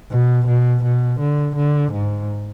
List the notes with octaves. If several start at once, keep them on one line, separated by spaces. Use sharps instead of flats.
B2
B2
B2
D3
D3
G#2